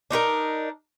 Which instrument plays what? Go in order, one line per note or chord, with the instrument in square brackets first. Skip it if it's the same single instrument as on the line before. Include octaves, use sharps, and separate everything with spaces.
[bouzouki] D4 D#4 F4 A#4